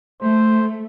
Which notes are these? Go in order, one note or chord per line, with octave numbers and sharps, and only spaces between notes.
A3 C5